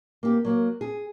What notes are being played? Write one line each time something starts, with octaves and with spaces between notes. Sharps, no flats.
A#3 G4
F#3 A#3
G#4